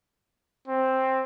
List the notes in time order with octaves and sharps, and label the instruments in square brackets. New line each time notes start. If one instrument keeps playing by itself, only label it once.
[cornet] C4